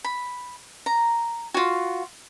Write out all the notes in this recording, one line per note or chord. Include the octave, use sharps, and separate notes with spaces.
B5
A#5
F4 F#4